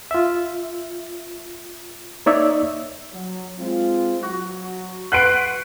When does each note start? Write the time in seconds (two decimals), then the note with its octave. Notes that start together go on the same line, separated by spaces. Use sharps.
0.11 F4 E5
2.26 A#3 D#4 C#5 D5 E5 E6
3.13 F#3
3.58 G#3 C4 F4
4.23 F#3 F#4
5.12 B4 F#5 C6 F#6 D7